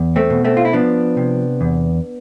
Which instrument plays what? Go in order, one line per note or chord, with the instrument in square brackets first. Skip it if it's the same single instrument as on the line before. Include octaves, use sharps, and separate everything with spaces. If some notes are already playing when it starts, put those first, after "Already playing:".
Already playing: [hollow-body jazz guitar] E2
A3 C4
B2
A3 C4
F4
E4
F3 B3 D4
C3
E2